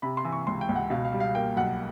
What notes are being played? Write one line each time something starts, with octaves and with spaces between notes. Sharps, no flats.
C3 B5
C6
E3
C#6
C#2 C6
G5
C#2
F#5
B2 F5
F5
G3
F5
A#3 G5
B1 F#5